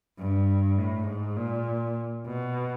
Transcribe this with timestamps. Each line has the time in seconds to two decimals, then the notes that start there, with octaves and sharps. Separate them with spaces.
0.19 G2
0.79 A2
1.08 G#2
1.37 A#2
2.26 B2